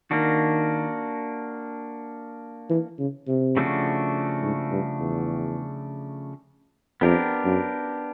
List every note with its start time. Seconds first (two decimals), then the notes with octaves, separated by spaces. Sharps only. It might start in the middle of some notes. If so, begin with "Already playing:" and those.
0.11 D#3 A#3 D4 F#4
2.70 E3
2.98 C#3
3.27 C3
3.57 C#3 F3 A3 D4 F#4
4.42 G#2
4.71 G2
5.00 E2
7.01 F2 B3 D4 G4 A#4
7.45 F#2